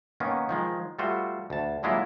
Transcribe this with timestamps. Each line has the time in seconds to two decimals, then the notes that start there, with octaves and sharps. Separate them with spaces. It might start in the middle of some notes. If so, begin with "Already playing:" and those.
0.20 D#3 A#3 B3 C#4
0.49 D#3 F3 G#3
0.99 G3 A3 F4 F#4 C5
1.50 D2 A5
1.83 D3 F#3 G#3 A#3 E4 F4